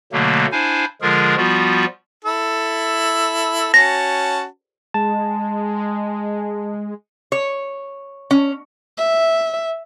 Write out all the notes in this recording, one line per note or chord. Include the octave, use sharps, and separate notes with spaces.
B2 D3 F#3 A3 A#3
D4 E4 C5 F5 G#5
D3 F3 G#3 F4 G#4 A#4
F3 G3 B3 F4 F#4
E4 A4
C#4 F#4 A5 A#6
G#3 A5
C#5
C#4
E5